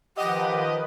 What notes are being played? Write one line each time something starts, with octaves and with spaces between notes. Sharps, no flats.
D#3 F3 G4 B4 D#5 F#5